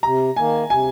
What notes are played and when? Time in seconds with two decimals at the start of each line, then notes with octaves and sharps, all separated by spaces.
0.03 C3 A#5
0.36 D#3 A#3 G#5
0.70 C3 G#5